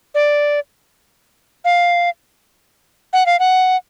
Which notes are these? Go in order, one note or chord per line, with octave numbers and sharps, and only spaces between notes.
D5
F5
F#5
F5
F#5